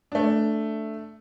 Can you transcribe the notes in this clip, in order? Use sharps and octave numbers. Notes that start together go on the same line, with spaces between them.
A3 D4